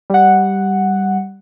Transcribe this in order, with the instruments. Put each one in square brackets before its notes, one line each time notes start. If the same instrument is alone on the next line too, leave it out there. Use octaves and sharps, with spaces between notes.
[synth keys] G3 F#5